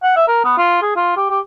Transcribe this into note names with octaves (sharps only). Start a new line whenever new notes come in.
F#5
E5
A#4
B3
F4
G#4
F4
G4
G4